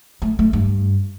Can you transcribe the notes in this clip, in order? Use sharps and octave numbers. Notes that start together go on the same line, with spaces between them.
A3
A3
G2